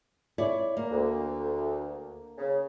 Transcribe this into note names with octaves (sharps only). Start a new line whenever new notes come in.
E4 C#5 D5
A#3
D2
C#3